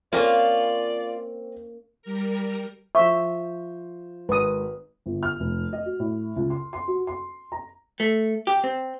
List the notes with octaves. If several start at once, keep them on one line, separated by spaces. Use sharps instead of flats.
A#3 C4 C#4 F4 D5
G3 A#4
F3 C5 E5 C#6
G#1 B4 D#6
G1
F6
F1
D#5
F#4
A2
C#2
C6
C6
F#4
C6
A#5
A3
G4
C4